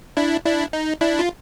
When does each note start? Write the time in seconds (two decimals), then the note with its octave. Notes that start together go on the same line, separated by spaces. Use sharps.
0.17 D4 E4
0.45 D4 E4
0.73 D#4
1.01 D4 E4
1.19 F4